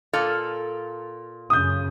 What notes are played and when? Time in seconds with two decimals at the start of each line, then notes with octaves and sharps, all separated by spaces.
0.13 A#2 A4 F5
1.50 F#2 C#3 D#6 G6